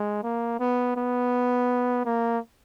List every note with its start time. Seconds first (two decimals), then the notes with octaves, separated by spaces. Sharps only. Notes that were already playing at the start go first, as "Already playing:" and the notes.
Already playing: G#3
0.23 A#3
0.60 B3
0.96 B3
2.05 A#3